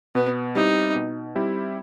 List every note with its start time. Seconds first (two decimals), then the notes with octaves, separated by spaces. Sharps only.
0.15 B2 B3
0.55 G3 C4 D#4 E4 G4
0.95 B2
1.35 G3 C4 E4 G4